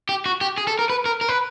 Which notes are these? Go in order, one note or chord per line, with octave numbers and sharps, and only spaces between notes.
G4
F#4
G4
G#4
A4
A#4
B4
A#4
A#4
B4